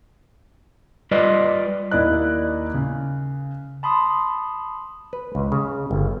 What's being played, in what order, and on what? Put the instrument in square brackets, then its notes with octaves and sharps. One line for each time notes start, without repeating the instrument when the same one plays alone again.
[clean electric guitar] G3 F4 B4 D5 D#5
[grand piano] D#2 E4 D5 D#5 F#6
C#3
[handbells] A5 B5 C6 D#6
[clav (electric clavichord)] B4
C#2
C#3
G1